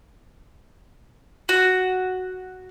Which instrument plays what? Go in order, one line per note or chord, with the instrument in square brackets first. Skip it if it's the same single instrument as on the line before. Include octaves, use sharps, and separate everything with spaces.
[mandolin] F#4